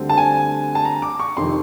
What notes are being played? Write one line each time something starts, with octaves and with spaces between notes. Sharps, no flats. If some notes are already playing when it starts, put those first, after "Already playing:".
Already playing: D2 D3 G3 C4
A5
G#5
A5
A#5
D6
C#6
F2 C3 D#3 C6